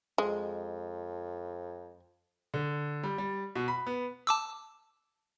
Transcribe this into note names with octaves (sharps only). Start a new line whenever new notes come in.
F2 G#3
D3
G3
G3
B2
B5
B3
A5 D6 E6